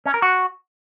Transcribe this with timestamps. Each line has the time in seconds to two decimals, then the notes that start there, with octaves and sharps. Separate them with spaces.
0.06 C#4
0.14 A#4
0.22 F#4